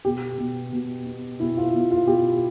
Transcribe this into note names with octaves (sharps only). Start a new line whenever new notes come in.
B2 G4
B2
B2
B3
B2 E4
F4
B2
F4
B2 G4